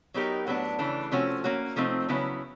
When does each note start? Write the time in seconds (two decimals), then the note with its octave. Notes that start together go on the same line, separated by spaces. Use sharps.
0.14 F#3 B3 D#4 G4 A#4
0.47 A2 F#3 B3 D4
0.79 C#3 E3 A3 D4
1.12 C3 F3 A3 C#4 F#4
1.44 A#3 C#4 F#4
1.76 C3 F3 A3 C4 D#4
2.09 C#3 F#3 B3 E4